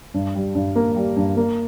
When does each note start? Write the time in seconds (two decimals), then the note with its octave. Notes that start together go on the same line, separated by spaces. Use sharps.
0.14 G2
0.35 G3
0.55 G2
0.76 A#3
0.96 G3
1.16 G2
1.37 A#3